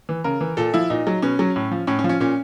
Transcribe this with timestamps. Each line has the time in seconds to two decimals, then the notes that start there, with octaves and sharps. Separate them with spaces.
0.09 E3
0.24 C#3 A#4
0.41 E3
0.57 A#2 A4
0.74 F3 E4
0.90 A#2 D#4
1.07 F#3
1.22 B2 C#4
1.39 F#3
1.56 A2
1.71 F3
1.87 A2 C#4
1.99 C#4
2.04 F3
2.09 C#4
2.20 A#2 C#4